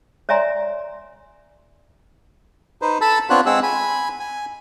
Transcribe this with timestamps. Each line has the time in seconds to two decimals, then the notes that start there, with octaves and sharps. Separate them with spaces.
0.29 C#5 D5 E5 G#5 A#5 C6
2.82 D#4 B4 C5
3.01 A4 A5 B5 E6
3.30 B3 C4 D4 F4 C#5 F#6
3.46 G#3 C4 G#4 F#5 E6
3.63 G#5 B5
4.20 G#5